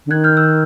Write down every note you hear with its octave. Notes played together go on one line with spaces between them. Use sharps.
D3
D#3 F#6 G#6
F6 G6
E6 F#6